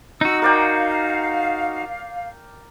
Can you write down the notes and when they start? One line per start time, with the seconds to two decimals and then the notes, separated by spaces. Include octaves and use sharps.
0.21 C4 D#4 F#4 D#6 E6
0.42 A#4 D5 F5 G5